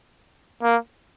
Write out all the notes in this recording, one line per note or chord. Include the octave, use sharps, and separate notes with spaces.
A#3